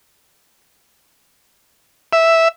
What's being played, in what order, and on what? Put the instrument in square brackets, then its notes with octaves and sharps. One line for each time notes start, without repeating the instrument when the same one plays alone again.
[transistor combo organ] E5